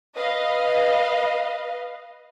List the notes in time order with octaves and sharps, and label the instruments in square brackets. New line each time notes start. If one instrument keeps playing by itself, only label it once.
[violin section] B4 D#5 F5